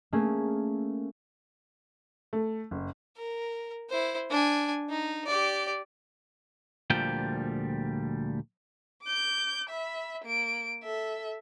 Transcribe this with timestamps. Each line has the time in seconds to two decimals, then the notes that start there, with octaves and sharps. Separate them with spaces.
0.13 A3 A#3 C#4 G#4
2.33 A3
2.71 F#1
3.17 A#4
3.90 E4 C5
4.30 D4 G#5
4.90 D#4
5.26 G4 D5
6.90 D2 A#2 F3 G3 G5
9.02 D6 G6
9.69 E5 B5
10.24 A#3 D7
10.83 A4 E5